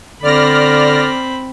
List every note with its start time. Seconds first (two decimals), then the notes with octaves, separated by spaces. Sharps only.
0.23 D3 C4 D5 B5 F6 A#6